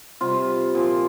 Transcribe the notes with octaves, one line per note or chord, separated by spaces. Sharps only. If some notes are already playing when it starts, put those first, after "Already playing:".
C3 G3 F4
A#2 F3